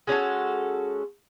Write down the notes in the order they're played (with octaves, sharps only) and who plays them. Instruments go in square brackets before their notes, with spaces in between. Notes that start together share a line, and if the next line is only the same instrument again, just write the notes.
[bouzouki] G#3 C#4 F#4 A4